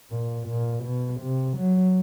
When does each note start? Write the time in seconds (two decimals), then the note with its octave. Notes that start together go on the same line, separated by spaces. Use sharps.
0.11 A#2
0.48 A#2
0.84 B2
1.21 C3
1.58 F#3